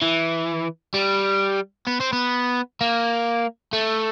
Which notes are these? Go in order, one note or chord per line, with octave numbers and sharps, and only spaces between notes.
E3
G3
B3
C4
B3
A#3
A3